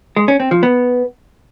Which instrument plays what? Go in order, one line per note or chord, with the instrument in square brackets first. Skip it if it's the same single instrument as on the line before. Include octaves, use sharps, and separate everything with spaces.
[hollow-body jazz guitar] G#3
C#4
C4
F3
B3